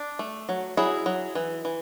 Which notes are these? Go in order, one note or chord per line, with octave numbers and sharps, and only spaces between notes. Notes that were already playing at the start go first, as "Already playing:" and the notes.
Already playing: D4
A3
F#3
F#3 E4 G#4
F#3
E3
E3